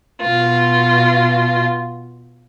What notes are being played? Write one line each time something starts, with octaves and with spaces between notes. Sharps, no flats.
B2 F4